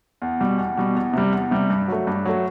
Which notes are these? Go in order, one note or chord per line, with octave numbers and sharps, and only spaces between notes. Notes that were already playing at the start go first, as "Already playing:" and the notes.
E2
B2 G3
E2
B2 G3
E2
C3 G3
E2
C3 G3
G2
F#3 A3
G2
F#3 A3